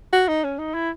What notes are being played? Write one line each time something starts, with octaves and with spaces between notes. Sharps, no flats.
F#4
D#4
C#4
D#4
E4